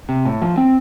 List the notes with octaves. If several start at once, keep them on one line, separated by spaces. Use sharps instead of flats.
C3
A2
F3
C4